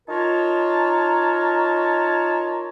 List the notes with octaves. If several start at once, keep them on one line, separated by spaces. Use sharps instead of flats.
D#4 F4 A#4 C#5 A5 A#5